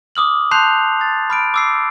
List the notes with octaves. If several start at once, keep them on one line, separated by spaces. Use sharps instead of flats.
D6 D#6 F6 F#7
A5 C6 F#6 G6 C7 F7
A6
B5 F6 D7
D6 E6 C7